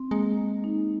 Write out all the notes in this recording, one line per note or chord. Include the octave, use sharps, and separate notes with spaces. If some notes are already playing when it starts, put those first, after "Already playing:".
Already playing: C4
G#3 A#3
A#3
D#4